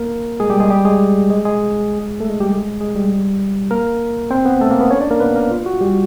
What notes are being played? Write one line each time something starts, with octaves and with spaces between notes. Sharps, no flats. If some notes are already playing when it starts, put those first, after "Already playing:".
Already playing: A#3 A#4
G#3 G#4
G3 G4
G#3 G#4
G3 G4
G#3 G#4
G#3 G#4
G#3 G#4
A3 A4
G#3 G#4
G3 G4
G#3 G#4
G#3 G#4
G3 G4
A#3 A#4
C4 C5
B3 B4
A3 A4
A#3 A#4
B3 B4
C#4 C#5
D4 D5
A#3 A#4
B3 B4
A#3 A#4
F4
F#4
G3 G4